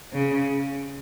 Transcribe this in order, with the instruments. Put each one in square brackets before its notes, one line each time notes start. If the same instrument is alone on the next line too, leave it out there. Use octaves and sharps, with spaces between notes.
[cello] C#3